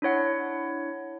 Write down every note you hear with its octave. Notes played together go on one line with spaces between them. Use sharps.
D4 E4 C#5 F#5